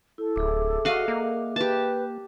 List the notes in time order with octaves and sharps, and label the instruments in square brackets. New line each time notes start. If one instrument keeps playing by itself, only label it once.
[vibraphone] E4 [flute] A4
[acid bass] D1 [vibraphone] G#4 E5 D6
[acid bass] F#4 [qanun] D#5 F5 F#5
[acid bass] A#3
[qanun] G4 A5 [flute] B4